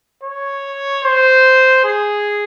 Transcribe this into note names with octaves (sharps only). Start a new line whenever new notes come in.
C#5
C5
G#4